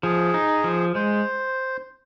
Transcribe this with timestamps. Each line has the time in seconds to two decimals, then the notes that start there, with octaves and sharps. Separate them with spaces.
0.03 F3 G#4
0.34 D#4
0.64 F3
0.95 G#3 C5